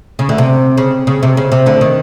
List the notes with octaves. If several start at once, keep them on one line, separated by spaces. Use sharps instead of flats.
C#3
D2 D3
C3
C#3
C#3
C3
C#3
C3
D2 D3
D#3